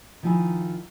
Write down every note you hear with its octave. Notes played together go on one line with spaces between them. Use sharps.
D#3 F3 D#4 E4 G#5